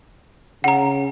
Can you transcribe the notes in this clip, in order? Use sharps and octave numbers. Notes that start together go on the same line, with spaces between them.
C#3 F#5 A#5